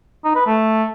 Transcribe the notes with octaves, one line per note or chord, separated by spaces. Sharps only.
D#4
B4
A3